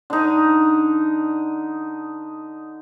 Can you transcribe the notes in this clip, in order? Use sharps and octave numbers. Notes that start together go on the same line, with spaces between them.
D3 D#4